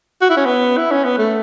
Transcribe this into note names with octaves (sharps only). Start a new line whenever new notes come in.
F#4
E4
C#4
B3
E4
C#4
B3
A3